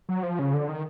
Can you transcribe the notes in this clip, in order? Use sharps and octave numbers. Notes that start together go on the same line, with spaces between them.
F#3
F3
C#3
D3
D#3